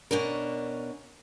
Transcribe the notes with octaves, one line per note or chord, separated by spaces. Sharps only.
B2 C#4 D4 A#4